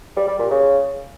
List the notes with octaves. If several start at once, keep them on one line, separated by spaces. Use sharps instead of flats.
G3
G3
A#2
C#3